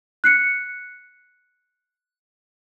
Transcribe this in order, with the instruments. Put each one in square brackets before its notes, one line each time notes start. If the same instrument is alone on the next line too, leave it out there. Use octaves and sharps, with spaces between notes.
[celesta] F#6 C7 C#7